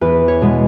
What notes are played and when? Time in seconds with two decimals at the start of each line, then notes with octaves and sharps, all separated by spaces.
0.01 E2 B4
0.28 C#5
0.41 B2 G#3 B3